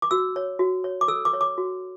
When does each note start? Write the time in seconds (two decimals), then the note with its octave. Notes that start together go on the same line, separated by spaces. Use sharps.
0.02 D6
0.11 F#4 E6
0.36 C#5
0.59 F#4
0.84 C#5
1.01 D6
1.08 A4 E6
1.25 D6
1.33 C#5
1.41 D6
1.58 F#4